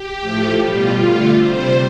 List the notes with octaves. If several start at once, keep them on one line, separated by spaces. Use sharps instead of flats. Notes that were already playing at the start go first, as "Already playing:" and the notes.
Already playing: G4
A2 F3 A3
B2 G3 F4
D3 A3
C3 G3 C5